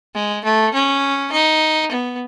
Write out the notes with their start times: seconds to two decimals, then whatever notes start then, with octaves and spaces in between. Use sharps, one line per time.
0.15 G#3
0.44 A3
0.74 C#4
1.32 D#4
1.91 B3